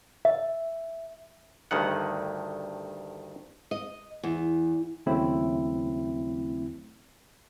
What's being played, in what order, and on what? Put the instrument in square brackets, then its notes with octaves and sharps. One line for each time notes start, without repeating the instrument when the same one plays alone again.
[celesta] E5
[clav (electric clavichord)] D2 G2 D#3 F#5
[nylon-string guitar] D#5
E2
[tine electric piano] D#2 C#3 F#3 A3 C4 E4